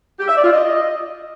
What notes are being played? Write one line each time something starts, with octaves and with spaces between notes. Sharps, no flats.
G4
E5
D5
F4
D#5